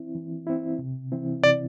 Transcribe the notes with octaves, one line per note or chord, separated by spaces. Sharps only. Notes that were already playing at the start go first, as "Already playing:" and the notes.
Already playing: E3 C4 E4
E3
C4 E4
C3
E3 C4 E4
C3 D5